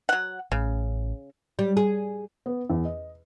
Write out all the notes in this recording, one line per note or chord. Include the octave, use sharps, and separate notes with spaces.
F#3 F#5
A1 C#3
G3
G#4
B3
E2
D#5